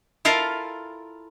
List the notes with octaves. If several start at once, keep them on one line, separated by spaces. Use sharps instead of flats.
E4 F4 A4 A#4 F5